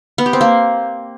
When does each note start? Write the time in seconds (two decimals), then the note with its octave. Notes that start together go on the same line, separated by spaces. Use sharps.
0.18 B3
0.26 G4
0.33 C4
0.41 A#3